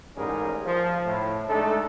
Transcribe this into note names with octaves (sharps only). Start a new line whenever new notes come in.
A1 G#2 G3 C#4 G#4 A#4
F3
A2
G#3 A3 D4 D#4 A4